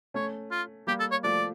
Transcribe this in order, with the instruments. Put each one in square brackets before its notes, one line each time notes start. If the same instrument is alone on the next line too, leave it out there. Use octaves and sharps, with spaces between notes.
[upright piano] A3 C#4 [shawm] C#5
[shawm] F4
[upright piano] G3 A#3 [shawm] G4
[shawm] A4
C#5
[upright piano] F3 A3 [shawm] D5